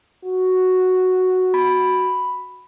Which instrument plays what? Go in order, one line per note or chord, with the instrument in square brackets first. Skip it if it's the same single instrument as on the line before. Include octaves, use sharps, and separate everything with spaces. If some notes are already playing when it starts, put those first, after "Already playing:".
[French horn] F#4
[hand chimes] B5